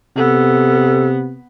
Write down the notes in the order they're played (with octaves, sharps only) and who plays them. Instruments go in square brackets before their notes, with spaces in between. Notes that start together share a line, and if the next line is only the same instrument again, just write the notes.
[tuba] C3 [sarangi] B3 [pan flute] A4